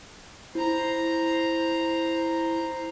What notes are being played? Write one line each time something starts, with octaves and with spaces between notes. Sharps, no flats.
E4 C5 A#5